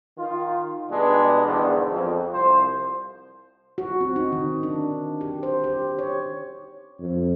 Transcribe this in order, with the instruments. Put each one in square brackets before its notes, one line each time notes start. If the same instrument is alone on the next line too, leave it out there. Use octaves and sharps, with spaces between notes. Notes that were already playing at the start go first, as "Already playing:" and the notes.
[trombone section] D#3 F4
B2 G3 G#3 B3 D4
E2 G#2 D3 D#3 D4
F2
C2 F3 C5
[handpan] F#4
C4
D#4
D#3
D4
G4
C5
G4
C#5
[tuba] F2